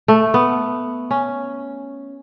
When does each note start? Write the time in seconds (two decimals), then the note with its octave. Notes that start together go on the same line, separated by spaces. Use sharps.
0.08 A3
0.34 B3
1.11 C#4